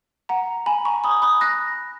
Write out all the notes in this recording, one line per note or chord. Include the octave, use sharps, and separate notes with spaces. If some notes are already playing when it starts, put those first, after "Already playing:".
F#5 A#5
G#5 B5
A#5 C#6
B5 D#6
B5 D#6
F#6 A#6